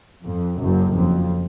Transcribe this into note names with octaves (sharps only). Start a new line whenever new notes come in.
F2
F#1 F#2
F2